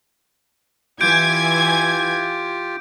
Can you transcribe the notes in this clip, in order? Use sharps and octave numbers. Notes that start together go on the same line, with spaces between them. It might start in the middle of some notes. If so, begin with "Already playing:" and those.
E3 F4 G4 G#5 G6 G#6 D7